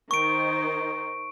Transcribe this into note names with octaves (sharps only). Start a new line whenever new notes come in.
D#3 D#4 C5 C#6 D7